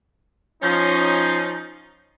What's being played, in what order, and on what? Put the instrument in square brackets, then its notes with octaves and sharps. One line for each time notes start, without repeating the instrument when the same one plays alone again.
[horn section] F3 C#4 D#4